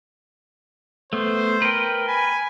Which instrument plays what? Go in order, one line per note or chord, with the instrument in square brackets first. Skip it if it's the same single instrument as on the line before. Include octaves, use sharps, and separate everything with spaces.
[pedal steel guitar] A3 B3 [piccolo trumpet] C5
[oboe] A#4 [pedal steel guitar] B4 G5
[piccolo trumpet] G#5 [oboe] B5